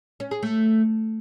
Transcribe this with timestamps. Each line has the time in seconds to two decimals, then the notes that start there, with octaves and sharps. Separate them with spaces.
0.20 C#4
0.31 G#4
0.43 A3